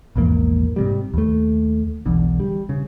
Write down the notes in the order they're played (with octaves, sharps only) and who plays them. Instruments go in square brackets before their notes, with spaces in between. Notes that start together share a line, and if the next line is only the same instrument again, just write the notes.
[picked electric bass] A#1 E2 G#2 A#3
G#2 C3 G3
D#2 A3
E1 B1 E2 D3
G3
C#3